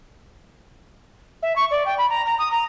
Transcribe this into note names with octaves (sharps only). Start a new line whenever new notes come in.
E5
C#6
D5
G5
B5
A#5
A#5
D#6
A#5